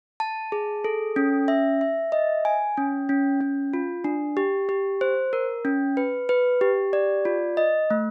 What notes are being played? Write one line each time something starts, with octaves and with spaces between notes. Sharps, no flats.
A5
G#4
A4
C#4
E5
E5
D#5
G#5
C#4
C#4
C#4
F4
D4
G4
G4
C5
A#4
C#4
B4
B4
G4
D5
F4
D#5
A3